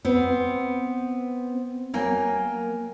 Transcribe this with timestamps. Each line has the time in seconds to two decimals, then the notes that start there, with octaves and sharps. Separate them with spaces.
0.05 B3 C4
1.93 F#3 A#3 A#4 G5 G#5